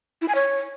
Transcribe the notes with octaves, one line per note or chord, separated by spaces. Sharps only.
E4
G#5
C#5